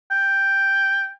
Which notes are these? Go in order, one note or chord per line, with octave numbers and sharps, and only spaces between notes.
G5